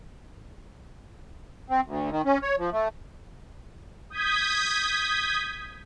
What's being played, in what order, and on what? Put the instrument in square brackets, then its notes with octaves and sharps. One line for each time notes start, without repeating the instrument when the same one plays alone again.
[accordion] C4
D2
D#3
C#4
C#5
F3
A3
[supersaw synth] D#6 G6 G#6 B6